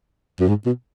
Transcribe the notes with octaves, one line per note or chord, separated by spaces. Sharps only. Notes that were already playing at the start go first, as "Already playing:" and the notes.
F#2
G#2
B2